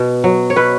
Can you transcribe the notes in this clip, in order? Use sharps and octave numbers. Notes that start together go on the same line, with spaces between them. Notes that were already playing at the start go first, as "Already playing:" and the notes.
Already playing: B2 B3
F#3
C#5
B2 B4